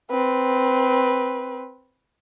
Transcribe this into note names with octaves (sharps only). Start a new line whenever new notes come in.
C4 B4